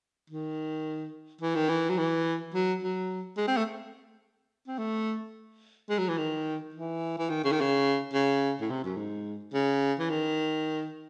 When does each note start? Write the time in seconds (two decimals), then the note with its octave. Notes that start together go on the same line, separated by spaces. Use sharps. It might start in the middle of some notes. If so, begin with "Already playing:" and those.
0.30 D#3
1.41 E3
1.55 D#3
1.69 E3
1.89 F#3
1.98 E3
2.54 F#3
2.82 F#3
3.37 G#3
3.48 C4
3.57 A3
4.68 C4
4.78 A3
5.90 G#3
5.99 F#3
6.08 E3
6.18 D#3
6.74 E3
7.18 E3
7.30 D#3
7.44 C#3
7.52 D#3
7.61 C#3
8.13 C#3
8.61 A2
8.70 C3
8.84 F#2
8.97 G#2
9.54 C#3
9.99 E3
10.10 D#3